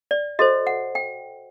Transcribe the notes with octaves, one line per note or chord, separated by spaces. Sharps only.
D5
F#4 A4 C5 D#5
F#5
G5